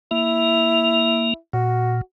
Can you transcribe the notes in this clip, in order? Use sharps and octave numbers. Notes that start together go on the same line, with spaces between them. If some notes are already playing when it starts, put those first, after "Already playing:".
A#3 E4
A#2 F#4